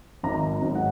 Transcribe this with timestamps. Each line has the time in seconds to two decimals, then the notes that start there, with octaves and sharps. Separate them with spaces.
0.23 G#1 A#5
0.62 G#2 F#3
0.75 F#5